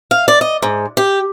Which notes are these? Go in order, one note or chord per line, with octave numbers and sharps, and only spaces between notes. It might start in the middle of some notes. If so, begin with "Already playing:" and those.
F5
D5
D#5
G#2
G4